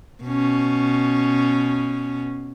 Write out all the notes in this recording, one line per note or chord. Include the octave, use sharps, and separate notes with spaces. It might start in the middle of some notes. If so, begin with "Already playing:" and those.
B2 C#4